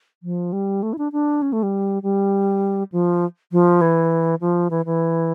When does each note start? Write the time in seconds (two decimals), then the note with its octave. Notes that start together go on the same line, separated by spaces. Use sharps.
0.23 F3
0.53 G3
0.83 A3
0.93 E4
0.98 D4
1.12 D4
1.42 C#4
1.53 A3
1.63 G3
2.03 G3
2.92 F3
3.52 F3
3.81 E3
4.41 F3
4.70 E3
4.85 E3